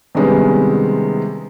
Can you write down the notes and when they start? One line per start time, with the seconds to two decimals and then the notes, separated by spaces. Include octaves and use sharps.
0.15 C3 D#3 G3 G#3 B3 C#4